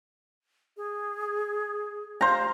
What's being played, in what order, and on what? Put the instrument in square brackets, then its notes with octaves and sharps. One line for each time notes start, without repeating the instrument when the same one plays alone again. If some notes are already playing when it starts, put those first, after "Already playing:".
[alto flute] G#4
[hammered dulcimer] C5 A#5 [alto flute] F5